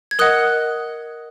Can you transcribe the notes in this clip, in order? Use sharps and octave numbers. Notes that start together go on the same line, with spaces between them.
G#6
A#4 D#5 F#5 D#6 F#6